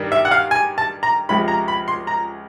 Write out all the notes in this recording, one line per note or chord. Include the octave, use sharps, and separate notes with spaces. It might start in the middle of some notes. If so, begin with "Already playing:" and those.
Already playing: G2 D#3 G3
E5
F#5
F5
G#5
A5
A#5
C#2 C3 F3 G#3 B5
A#5
B5
C6
A#5